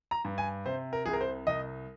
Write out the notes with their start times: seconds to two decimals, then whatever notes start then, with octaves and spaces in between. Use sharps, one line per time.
0.11 A#5
0.25 G2
0.38 G#5
0.66 C3 C5
0.93 A#4
1.06 C2 G#4
1.13 A#4
1.21 C5
1.47 C2 D#5